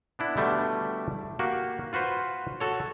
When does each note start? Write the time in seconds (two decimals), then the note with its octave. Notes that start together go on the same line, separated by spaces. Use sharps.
0.19 B3 D4 E4
0.36 B2 D3 G3 A3 D4
1.39 A#3 F#4 G4
1.93 F4 F#4 B4 C5
2.60 F#4 A4 C#5